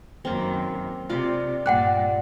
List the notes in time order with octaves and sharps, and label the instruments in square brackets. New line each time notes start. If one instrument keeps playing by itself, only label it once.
[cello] F#2 D#3 [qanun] A#3 C4
[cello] C3 [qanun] F4 D5 D6
[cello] G2 A#2 [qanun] D5 [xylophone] F#5 G5 F#6